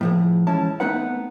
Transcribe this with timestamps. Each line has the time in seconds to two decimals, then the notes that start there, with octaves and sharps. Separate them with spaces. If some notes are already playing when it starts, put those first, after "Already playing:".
0.01 A2 F3 G#4
0.47 E3 G#3 C#4 E4 A5
0.80 A3 B3 C4 D#4 B4 F#5